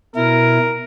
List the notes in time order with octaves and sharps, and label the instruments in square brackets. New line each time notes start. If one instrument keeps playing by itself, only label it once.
[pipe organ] B2 E4 [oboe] A#4